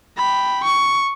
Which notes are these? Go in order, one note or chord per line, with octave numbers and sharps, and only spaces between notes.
G5 B5
C#6